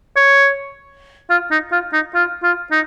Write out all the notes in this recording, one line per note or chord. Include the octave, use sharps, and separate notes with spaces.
C#5
F4
D#4
F4
D#4
F4
F4
D#4